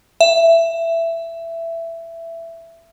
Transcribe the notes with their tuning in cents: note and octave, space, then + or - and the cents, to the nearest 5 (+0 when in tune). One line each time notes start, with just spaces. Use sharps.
E5 +15